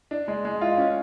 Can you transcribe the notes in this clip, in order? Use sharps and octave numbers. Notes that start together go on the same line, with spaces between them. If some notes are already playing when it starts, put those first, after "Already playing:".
D4
G#3
G#3
F4
C#4